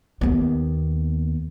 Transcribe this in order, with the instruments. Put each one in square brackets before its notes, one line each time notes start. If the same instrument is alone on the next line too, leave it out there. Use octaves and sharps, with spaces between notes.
[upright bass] D#2 B3